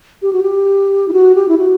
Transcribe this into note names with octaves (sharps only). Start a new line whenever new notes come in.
G4
F#4
G4
E4
F#4
G4
E4
F#4